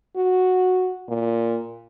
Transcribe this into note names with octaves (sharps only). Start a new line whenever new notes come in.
F#4
A#2